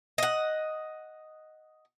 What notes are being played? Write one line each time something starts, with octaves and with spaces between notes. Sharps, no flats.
D#5 F#5